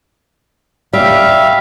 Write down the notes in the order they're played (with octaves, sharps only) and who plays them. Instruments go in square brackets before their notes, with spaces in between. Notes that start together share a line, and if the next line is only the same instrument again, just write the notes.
[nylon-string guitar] G3 [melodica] E5 F5